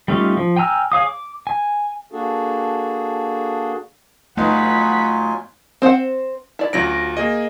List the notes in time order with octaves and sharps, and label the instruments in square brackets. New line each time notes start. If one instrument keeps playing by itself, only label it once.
[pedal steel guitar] G3 A3 C#4 D#4 F4
F3
G5 G#5 A#5 E6 F6
G#4 C#5 F5 D#6
D6
G#5
[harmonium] A#3 D4 F#4 G#4 A4
[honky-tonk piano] G1 D#4 [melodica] F#3 F4 G#5 [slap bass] A3 [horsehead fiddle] F#5 B5
[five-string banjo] C4 C5 F5 F#5
E4 D5
[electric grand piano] D2 A#6 D7 [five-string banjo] F#3 C#4 F4
[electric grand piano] A#3 G#4 D#5